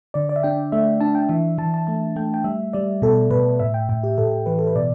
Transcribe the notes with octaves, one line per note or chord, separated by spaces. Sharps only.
D3 D5
D5
E5
D4 G5
A3 E5
D4 A5
G5
E3 E5
E3 A5
A5
A3 A5
A3 G5
G5
G3 E5
G3 D5
B2 A4
B2 B4
A2 E5
G5
A2 G5
G4
A2 A4
E3 B4
A4
B4
B2 D5